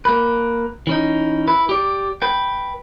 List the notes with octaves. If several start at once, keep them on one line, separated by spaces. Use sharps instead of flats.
A#3 B4
E3 C#4 D#4
E4 B4
G4 D5
B4 G5